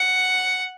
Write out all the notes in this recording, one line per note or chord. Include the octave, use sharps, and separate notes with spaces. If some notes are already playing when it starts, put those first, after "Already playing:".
Already playing: F#5